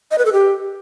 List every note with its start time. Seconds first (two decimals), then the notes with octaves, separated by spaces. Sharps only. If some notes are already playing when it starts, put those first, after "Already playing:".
0.11 D#5
0.18 B4
0.25 A4
0.33 G4